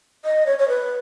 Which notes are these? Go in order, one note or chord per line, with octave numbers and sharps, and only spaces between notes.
D#5
C#5
C#5
B4